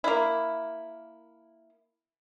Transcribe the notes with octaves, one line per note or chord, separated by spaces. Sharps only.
A#3 E4